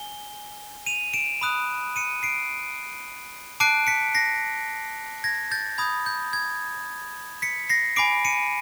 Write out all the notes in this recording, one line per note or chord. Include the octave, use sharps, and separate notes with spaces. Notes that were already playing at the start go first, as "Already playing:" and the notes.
Already playing: G#5 G7
D#7 F7
D7 E7
B5 D#6 F#6
C#7 D#7
C7 D7
A5 D6 F#6 C7 D7
B6 C#7
A#6 C7
G#6 A#6
G6 A6
B5 D#6 G6 G#6
G6
G#6
B6 C#7
A#6 C7
G#5 B5 D6 C7 D7
C#7 D#7